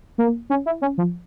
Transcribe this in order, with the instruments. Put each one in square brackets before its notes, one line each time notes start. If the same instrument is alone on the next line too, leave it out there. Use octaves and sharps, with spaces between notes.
[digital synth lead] A#3
C#4
E4
C#4
F3